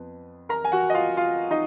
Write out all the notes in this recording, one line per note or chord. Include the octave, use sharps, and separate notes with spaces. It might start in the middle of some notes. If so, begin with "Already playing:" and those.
Already playing: F2 B3
A#4 A#5
G#5
F#4 F#5
D#5
F4 F5
F4 F5
D#4 D#5